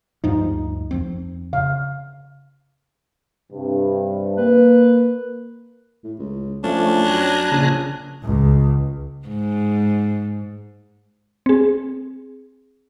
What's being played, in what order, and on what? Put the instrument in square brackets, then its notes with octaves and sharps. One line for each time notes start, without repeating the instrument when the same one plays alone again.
[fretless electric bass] D2 G2 F3 [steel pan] D#4
[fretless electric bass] F2 F3 C4
[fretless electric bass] C#3 [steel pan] F5
[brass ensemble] G2 C3
[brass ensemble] A#3 [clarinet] B4
[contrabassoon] A2
C#2
[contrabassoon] F3 [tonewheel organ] A3 [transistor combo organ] C#4 [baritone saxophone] D4
[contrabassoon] F#2 [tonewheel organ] G#5 A#5 F#6
[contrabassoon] A#1 [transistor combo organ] C#3
[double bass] C#2
[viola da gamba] G#2
[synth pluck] C4 G#4